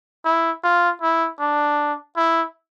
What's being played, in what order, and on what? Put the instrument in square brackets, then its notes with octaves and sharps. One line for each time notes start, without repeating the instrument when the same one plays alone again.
[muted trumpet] E4
F4
E4
D4
E4